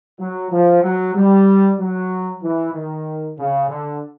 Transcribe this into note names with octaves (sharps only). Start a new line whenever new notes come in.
F#3
F3
F#3
G3
F#3
E3
D#3
C#3
D3